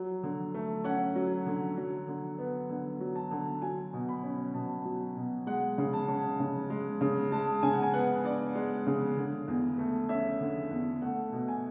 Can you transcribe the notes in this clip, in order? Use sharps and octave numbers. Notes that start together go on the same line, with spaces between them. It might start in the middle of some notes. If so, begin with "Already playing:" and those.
Already playing: F#3
D3
A3
C#4 F#5
F#3
D3
F#3
D3
B3
D3
F#3
A5
D3
F#3 G#5
B2
B5
C#4
B2 A5
F#3
B2
G#3 F#5
C#3
A5
C#4
C#3
G#3
C#3
G#3 A5
C#3 G#5
F#5
G#5
B3 F#5
D4 D5
G#3
C#3
D3
E2
A3
C#4 E5
D3
E2
A3 F#5
B2
G#5